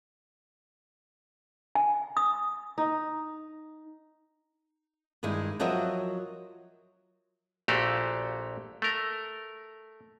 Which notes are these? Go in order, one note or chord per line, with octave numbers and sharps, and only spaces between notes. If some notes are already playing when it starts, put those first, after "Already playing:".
G#5
D#6
D#4
G2 D#3 G#3 E4
F3 F#3 F#4 A#4 D#5 E5
A#1 A#2 A3 F#4 G4 F5
A3 A#4